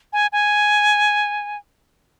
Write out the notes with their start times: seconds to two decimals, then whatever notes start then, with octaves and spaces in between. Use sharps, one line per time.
0.13 G#5
0.32 G#5